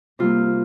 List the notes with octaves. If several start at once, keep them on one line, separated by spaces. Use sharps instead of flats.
C3 G3 A#3 F4